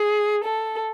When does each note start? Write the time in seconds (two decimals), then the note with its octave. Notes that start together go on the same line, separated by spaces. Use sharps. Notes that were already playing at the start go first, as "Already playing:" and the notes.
Already playing: G#4
0.43 A4